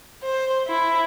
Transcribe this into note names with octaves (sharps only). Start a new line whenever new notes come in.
C5
E4